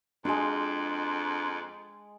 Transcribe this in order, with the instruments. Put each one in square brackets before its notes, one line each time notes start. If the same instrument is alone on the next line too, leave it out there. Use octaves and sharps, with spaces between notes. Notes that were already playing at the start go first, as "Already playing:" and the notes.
[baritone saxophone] F2 [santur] G#3 C6 [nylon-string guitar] D4 F4 F#4